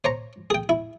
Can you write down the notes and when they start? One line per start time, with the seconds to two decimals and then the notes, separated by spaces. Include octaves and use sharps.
0.04 C5 C#5 A#5
0.50 G#4 G5
0.69 E4